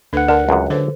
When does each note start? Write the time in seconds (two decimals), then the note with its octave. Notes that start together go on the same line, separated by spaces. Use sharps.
0.13 D2 D4 A4 B4 F#5
0.28 D3 A#4
0.49 C#2 F#2
0.70 D3 A4 B4 C5